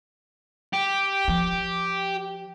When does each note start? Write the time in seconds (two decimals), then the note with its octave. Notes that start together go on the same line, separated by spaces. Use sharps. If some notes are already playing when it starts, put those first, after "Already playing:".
0.73 G4
1.28 F3